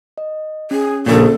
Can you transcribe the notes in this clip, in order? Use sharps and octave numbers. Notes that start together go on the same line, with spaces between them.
D#5
C#4 G#4
A#1 A#2 C#3 A4